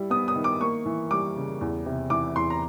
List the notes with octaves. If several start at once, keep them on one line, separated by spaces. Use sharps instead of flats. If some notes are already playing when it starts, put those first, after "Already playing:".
Already playing: G3 E4
B3 D#6
D#6
D#3
D6
A#3 C#6
E3
G3 D6
C#3
E2
C3
E3 D6
E2 C6
A#5